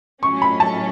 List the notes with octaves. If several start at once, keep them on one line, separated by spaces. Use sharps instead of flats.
A2 F#3 C#4 C#6
B5
A5